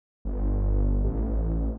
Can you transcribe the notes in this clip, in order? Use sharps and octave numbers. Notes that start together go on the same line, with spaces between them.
G1
A1